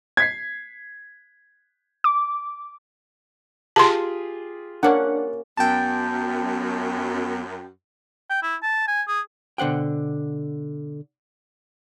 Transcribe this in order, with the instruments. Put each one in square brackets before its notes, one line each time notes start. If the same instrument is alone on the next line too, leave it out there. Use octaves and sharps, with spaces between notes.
[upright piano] G#6 B6 C7
[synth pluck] D6
[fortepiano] F4 G4 G#4 [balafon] A5 C6
[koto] A#3 C#4 [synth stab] D4 F#5
[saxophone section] F#2 [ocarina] B3 [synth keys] G5 A5
[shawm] G5
E4
A5
G#5
G#4
[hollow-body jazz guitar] B2 D3 C5 F#5 G5